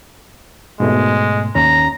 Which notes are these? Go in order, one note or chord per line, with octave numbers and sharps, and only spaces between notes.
G#2 B2 G#3 A3
D#2 C#4 A#5